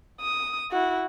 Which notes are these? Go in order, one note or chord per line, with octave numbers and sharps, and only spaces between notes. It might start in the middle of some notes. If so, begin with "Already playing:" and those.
D#6
E4 F#4